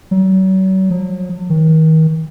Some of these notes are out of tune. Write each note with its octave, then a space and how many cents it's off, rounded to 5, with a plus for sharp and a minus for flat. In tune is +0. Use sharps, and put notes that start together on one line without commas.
F#3 +40
F#3 -45
D#3 +35